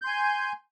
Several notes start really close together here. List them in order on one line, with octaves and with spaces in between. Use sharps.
G6 C6 G#5